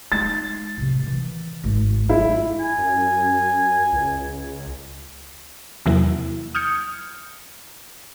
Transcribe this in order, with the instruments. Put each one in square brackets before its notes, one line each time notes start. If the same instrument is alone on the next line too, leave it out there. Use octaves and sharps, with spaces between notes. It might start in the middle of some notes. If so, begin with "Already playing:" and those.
[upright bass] G#3 D#4 [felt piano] A6
[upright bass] A2 C3
D#3 E3
G#1
[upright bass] D1 F#2 [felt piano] E4
[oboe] G#5
[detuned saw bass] F#2
C#2
[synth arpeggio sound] E2 C3 F#3 A#3 E4
D#6 F6 G6 G#6 C#7